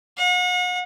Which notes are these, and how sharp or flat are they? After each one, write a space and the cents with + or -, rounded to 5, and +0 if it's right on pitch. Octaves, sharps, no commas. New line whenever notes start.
F#5 -40